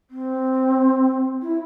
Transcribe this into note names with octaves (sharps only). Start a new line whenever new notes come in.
C4
E4